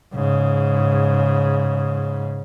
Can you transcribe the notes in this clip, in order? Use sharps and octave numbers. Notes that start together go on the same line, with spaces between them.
G#2 C#3